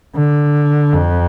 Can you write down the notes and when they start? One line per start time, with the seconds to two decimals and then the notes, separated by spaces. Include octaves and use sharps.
0.16 D3
0.93 F2